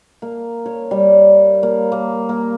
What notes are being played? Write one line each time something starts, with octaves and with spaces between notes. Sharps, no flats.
A#3
C#5
G3
A#3
A#3
A#3